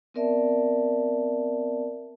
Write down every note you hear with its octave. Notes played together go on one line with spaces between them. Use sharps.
B3 C4 A#4 D5 E5 A5